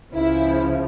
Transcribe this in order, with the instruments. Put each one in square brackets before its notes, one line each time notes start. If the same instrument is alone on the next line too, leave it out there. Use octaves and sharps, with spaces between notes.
[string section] C#2 C#3 F3 E4